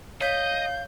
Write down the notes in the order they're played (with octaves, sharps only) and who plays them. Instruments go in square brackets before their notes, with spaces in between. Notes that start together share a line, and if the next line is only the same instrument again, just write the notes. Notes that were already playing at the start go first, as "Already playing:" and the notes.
[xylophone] C#5 B6 [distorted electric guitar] D#5 [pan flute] F5 [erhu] G6